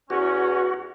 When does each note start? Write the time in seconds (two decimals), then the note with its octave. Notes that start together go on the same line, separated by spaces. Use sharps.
0.10 E2 C#4 F#4